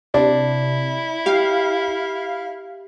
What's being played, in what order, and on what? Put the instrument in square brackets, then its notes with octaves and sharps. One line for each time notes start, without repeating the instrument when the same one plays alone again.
[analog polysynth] C3 [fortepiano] D4 [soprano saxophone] E4
[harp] G4 [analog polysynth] F5